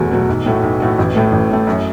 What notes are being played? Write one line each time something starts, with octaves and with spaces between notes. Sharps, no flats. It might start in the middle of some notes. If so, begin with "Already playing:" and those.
Already playing: E2 B2 F#3 A3 F#4
B2 F#3 A3 F#4
B1
A2 A3 F#4
B1
A2 A3 F#4
A1
A2 A3
A1
A2 A3
F#2